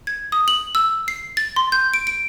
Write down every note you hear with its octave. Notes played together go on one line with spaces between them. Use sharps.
G#6
D#6
F#7
E6
C7
A6
C6
G6
D7
D7